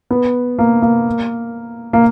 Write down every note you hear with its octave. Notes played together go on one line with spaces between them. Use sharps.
B3
A#3
A#3
A#3